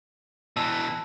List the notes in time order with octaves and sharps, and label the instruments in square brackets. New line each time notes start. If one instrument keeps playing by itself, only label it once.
[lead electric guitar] B2 E3 [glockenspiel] A5 E6